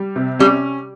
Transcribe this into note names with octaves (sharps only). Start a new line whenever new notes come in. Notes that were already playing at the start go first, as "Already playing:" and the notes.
Already playing: G3
C3
G3 C#4